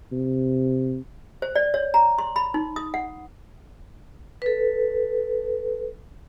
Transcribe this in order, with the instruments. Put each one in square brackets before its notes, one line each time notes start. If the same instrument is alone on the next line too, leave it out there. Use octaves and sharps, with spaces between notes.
[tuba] C3
[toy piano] C5
D5
C#5
A#5
C6
B5
D#4
D#6
F#5
[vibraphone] A4 B4